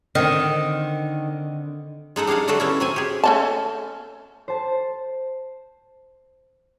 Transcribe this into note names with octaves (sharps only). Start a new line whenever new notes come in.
D3 D#3 C4
G#3 D#4 A4 F#5
G3 D4 G#4 F5 F#5
D3 F#3 A3 F#4 A4
B3 C#4 E4
F#3 C4 G#5
G4 G#4
A3 C#4 A5
C5 A5